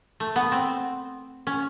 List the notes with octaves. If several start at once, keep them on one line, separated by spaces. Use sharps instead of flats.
A3
B3
C4
C#4